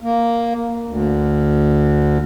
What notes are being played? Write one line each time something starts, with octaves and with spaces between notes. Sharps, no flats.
A#3
D2